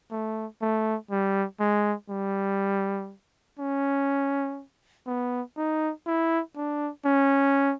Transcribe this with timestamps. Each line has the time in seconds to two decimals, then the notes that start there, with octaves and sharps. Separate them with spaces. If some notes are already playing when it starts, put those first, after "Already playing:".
0.11 A3
0.62 A3
1.11 G3
1.60 G#3
2.10 G3
3.59 C#4
5.07 B3
5.57 D#4
6.07 E4
6.56 D4
7.05 C#4